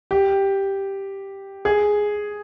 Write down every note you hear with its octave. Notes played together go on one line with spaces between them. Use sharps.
G4
G#4